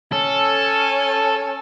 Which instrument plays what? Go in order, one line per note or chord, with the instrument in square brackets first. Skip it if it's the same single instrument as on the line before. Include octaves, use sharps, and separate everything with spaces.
[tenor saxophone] C#4 [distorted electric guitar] A4